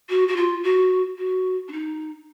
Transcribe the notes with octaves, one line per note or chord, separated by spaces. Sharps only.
F#4
F#4
F4
F#4
F#4
D4
D#4